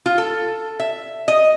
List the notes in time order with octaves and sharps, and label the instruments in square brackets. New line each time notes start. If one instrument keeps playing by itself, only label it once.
[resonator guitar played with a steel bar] F4
A4
E5
D#5